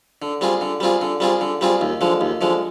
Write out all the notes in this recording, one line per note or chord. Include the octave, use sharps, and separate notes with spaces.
D3
G3 C4 F4 G#4
D3
G3 C4 F4 G#4
D3
G3 C4 F4 G#4
D3
G3 C4 F4 G#4
D#2
D3 F3 G#3
D#2
D3 F3 G#3